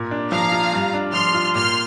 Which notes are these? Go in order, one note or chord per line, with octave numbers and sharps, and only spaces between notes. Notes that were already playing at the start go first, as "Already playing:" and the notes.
Already playing: A#2
D4
F3 F5 A#5
F4
G2
D4
F3 C6 F6
F4
A#2 C6 F6